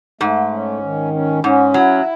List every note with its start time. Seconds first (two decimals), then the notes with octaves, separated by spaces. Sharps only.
0.21 G#2 A3
0.52 C#4
0.83 D#3
1.14 C#4
1.43 G#2 C#4
1.74 F#3 E4